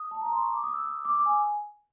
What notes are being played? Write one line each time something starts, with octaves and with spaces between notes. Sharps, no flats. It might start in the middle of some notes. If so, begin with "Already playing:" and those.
Already playing: D#6
A5
A#5
C6
C#6
D6
D#6
E6
D#6
D6
D6
G#5